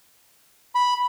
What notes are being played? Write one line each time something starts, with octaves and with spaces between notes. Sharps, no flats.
B5